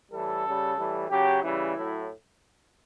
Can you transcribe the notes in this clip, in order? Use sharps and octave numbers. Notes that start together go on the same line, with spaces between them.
A2 E3 G3 A4
C#3 G3
A2 E3 G3
C#3 F#3 G4
C#3 E3 G3 E4
A2 F#3